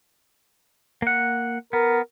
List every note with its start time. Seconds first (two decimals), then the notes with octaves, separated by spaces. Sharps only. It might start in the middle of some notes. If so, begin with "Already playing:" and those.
1.02 A#3 F#5
1.73 B3 A#4